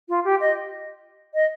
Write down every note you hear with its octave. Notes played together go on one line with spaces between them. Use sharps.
F4
G4
D#5
D#5